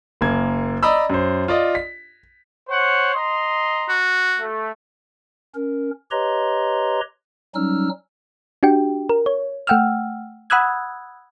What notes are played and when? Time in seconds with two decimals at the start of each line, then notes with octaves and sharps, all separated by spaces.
0.21 F#1 A#3 G#6
0.83 D5 D#5 A#5 B5 E6
1.10 F#2 C5
1.48 F4 D5 D#5
1.75 B6
2.68 C5 C#5 F#5
3.14 D#5 A#5 C6
3.89 F#4
4.40 A3
5.55 C#4 A#4
6.11 G4 B4 C#5 D#5 A#5 C6
7.55 F#3 G3 C#4 D#4 E6 F6
8.63 D4 F#4 G4 G5
9.09 A#4
9.26 C#5
9.67 A3 F#5 G5 E6 F6
10.50 F#5 B5 D#6 E6 F#6 G#6